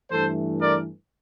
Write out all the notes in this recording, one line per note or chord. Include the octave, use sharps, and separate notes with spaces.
G2 E3 A3 A4 C5
A#4 D5